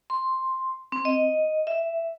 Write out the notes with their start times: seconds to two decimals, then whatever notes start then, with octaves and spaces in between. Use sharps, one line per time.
0.10 C6
0.92 C4
1.05 D#5
1.67 E5